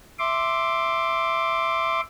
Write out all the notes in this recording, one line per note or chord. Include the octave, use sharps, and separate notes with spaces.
E5 C6 D6